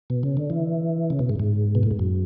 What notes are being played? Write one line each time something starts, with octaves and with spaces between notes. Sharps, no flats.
B2
C#3
D3
E3
C#3
B2
G#2
G#2
B2
A2
G#2
F#2